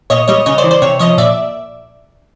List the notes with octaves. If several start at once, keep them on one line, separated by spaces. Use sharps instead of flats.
A#2 C#5 D#5
G3 C#5 D#5
C#3 C#5 D#5
C5 D5
E3
C5 D5
C3 C#5
F3 C#5 D#5
A#2 D5 E5